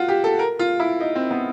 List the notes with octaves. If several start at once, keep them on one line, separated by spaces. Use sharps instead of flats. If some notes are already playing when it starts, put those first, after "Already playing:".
Already playing: F4 F#4
G4
A4
A#4
F4
E4
D#4
C4
B3